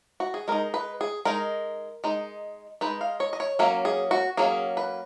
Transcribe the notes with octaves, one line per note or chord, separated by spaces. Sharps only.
F#4
G#4
G#3 D#4 A#4
B4
G#4
G#3 D#4 A#4
G#3 D#4
G#3 D#4 B4
F5
C#5
D#5
C#5
F#3 A#3 C#4 A#4
G#4
F#4
F#3 A#3 C#4 G#4
B4